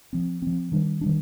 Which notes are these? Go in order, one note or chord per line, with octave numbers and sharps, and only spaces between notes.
F3 C4
F3 C4
D#3 G3 D4
D#3 G3 D4